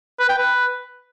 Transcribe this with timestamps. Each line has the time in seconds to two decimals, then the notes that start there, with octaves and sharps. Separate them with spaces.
0.20 B4
0.29 G5
0.38 B4